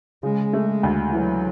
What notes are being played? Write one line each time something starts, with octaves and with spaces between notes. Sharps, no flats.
C#3 G#3
A3
D2
E3 F#3